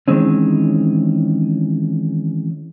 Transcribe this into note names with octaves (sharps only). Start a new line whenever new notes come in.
D#3 E3 G#3 C4 C#4